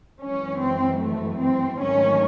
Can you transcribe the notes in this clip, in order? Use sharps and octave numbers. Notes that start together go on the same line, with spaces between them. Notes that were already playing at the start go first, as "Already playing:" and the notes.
F#2 E3 G#3 C#4
C4
A3
C4
G#2 D#3 F#3 A3 C#4